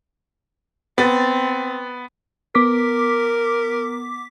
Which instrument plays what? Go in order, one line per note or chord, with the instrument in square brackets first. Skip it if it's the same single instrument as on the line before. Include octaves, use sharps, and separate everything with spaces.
[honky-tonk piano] B3 A6 [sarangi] C4
[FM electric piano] B3 D6 B6 [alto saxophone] A#4